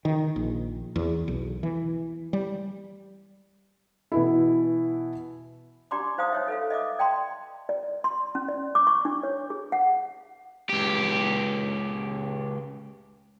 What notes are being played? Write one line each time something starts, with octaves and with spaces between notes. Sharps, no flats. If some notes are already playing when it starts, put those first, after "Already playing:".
D#3
A#1
E2
B1
E3
G3
B2 E3 E4
D4 G4 D5 A#5 C6 D6
D#4 C5 F5 A#5 D#6
D#4 C#5 E5
A4 B4 F5
D#5 E5 D6 D#6
D5 G5 A5 C6
D5
C6
C#4
D5
D6
C#6
D4
C#5
G#4
F#5
C#2 G4